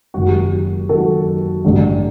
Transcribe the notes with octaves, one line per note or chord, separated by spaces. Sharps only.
F#1 F#2 D#3 F#4
G4
F#4
F#1 F#2 D#3 F#4 A4
A1 G2 D3 F#3